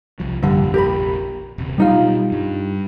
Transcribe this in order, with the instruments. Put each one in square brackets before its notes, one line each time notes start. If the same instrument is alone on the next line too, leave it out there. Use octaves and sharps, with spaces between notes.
[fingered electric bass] C2 F3
[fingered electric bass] F1 A#1 A#2 [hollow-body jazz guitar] G2 D3
[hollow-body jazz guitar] G4 A#4 B5
[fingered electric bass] D#1 C3
[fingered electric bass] B2 F#3 [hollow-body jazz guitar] G3 D#4 F4
[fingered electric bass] G2